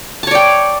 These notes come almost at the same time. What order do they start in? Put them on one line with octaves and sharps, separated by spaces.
A5 C#5 D5 G5